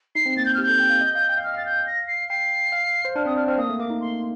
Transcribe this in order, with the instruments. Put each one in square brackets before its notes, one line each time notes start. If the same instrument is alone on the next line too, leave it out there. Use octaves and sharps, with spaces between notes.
[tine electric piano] D#4 [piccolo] C7
[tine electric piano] C4
[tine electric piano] A#3 [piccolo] A6
[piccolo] G6
[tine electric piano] G4 [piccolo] F6
[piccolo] G6
[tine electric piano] A4
G5
F5
D#5
F5
G5
F5
[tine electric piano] D#5 [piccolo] F6
[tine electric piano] F5 [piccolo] A6
[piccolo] G6
A#6
C7
[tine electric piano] G5 [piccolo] C7
[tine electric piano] F5
C5
[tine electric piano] D4 [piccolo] F6
[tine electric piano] C4 [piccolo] D#6
[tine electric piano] D4 [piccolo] F6
[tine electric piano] C4 [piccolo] F6
[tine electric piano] A#3 [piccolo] D#6
[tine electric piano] A3
[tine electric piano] A#3 [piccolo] D6
[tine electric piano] D#4
[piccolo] C6